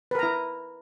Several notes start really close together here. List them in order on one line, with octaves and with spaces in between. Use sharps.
B4 A#4 A#5 E4